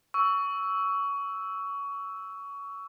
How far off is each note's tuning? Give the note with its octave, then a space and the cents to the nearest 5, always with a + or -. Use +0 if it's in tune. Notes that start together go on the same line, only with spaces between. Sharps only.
C#6 +20 E6 +0